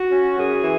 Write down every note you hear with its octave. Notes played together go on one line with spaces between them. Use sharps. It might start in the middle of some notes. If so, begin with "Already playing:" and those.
Already playing: F#4
C#4
F#2 G#4
E3